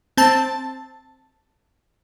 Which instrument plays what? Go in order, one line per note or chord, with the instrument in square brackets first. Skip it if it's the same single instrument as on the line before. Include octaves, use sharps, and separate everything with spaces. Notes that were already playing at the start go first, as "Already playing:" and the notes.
[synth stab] C4 A5